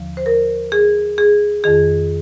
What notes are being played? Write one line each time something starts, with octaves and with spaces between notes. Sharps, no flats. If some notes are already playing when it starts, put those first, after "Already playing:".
Already playing: D#2 D3 F3
C5
A#4
G#4
G#4
F2 D#3 G#4